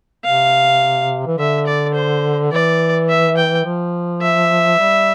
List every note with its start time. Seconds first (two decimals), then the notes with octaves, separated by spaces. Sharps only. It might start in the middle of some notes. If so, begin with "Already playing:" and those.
0.25 C3 F5
1.27 E3
1.38 D3 E5
1.67 D5
1.95 C5
2.52 E3 D5
3.09 E5
3.37 G5
3.65 F3
4.22 E5
4.79 G3